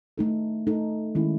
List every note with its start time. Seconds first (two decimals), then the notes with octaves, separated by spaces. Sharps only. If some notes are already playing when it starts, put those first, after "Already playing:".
0.18 A3 D#4 A4
0.67 A3 D#4 A4
1.15 D#3 G#3 C#4 E4